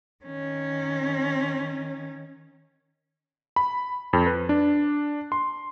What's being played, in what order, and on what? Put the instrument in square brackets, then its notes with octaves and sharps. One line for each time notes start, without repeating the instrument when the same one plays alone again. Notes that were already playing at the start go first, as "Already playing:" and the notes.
[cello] D#3 C#4
[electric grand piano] B5
F2
B4
D4
C6